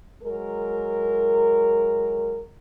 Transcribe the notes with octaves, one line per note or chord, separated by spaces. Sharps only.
F#3 G#3 A#4